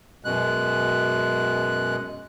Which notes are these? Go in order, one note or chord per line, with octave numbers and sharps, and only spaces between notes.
F#2 B2 G#3 F#6